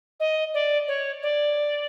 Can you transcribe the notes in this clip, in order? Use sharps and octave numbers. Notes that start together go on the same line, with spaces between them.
D#5
D5
C#5
D5